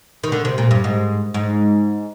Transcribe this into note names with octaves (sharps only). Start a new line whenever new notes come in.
D#3
D3
C3
A#2
G2
G#2
G#2